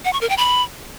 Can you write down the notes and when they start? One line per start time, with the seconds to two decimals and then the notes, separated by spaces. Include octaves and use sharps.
0.05 F#5
0.13 C#6
0.21 A#4
0.29 G5
0.38 B5